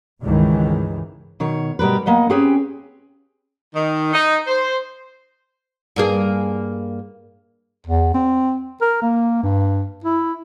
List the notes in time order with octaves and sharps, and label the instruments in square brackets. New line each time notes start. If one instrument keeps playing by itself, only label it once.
[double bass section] C#2 G2 D#3 E3 G#3
[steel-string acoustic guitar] B2 D#3 C#5
B2 G3 A#4 B4
A#3 B3 D#5 F#5
C4 C#4 G4 G#4 B4
[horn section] D#3
D#4
C5
[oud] G2 A#3 G#4
[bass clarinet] E2
C4
A#4
A#3
G2
E4